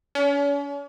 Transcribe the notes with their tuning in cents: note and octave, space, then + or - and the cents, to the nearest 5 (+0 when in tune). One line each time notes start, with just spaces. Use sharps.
C#4 +40